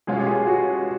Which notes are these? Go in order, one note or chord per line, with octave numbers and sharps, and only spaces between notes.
B2 G#3 C#4 F4 G#4
G4
G#4
F#4